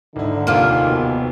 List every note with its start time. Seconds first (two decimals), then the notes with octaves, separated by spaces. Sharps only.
0.16 G#1 D3 D#4 E4
0.47 F1 D#2 C3 A#3 F4
0.87 B2